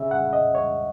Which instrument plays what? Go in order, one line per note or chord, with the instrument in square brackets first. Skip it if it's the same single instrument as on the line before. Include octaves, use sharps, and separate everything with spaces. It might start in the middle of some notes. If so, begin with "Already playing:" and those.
Already playing: [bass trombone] C#3 [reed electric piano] E5
[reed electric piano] F#5
D#5
C#5